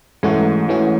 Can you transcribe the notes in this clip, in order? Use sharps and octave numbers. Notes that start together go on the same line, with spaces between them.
G#2 E3 A3 C#4 F#4
E3 A3 C#4 F#4